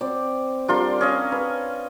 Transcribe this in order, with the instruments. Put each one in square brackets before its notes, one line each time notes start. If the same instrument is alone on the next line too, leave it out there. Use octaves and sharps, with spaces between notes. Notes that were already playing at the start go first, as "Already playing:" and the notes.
[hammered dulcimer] C4 D5
[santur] G3 F4 C6 [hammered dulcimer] D4 A#4
[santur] C#4 D#5 F5
[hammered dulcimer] B4